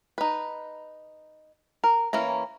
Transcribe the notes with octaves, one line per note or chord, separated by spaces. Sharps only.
D#4 B4
A#4
E3 A#3 C#4 A#5